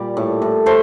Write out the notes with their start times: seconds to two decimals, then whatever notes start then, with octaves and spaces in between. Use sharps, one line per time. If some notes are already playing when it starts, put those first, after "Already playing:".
Already playing: A#2 G3 D5
0.17 A2
0.42 A2
0.66 A3 A4 C5